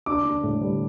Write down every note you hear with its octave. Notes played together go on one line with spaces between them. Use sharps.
D4 D6
D4
A2
G3